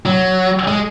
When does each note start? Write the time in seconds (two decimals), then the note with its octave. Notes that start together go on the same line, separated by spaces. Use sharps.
0.06 F#3
0.68 G#3